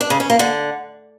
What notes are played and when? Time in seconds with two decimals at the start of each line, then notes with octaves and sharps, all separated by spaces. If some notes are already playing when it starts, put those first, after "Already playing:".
0.01 D4
0.10 C#3
0.20 C#4
0.30 A#3
0.39 D3